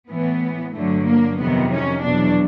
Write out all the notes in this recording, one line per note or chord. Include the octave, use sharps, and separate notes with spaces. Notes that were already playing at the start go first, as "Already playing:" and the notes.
A2 E3 B3
G2 D3 F#3 A3
A#3
F2 C3 D#3 F#3 B3
C#4
E2 B2 F#3 D4